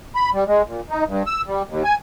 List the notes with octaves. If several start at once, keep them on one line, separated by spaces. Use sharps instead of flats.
B5
G3
G#3
A#2
D#4
G2
E6
G3
D#2
G#5